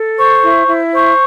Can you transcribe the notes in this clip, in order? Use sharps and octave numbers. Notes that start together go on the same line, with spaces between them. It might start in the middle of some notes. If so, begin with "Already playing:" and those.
Already playing: A4
C5 C#6
E4
E4
C5 C#6